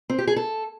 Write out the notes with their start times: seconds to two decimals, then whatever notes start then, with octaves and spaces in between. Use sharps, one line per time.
0.09 C4
0.18 G4
0.27 G#4
0.36 A4